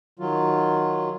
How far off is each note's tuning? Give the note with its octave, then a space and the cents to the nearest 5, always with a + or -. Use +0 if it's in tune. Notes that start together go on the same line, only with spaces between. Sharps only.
D#3 +0 F#3 +0 F4 +0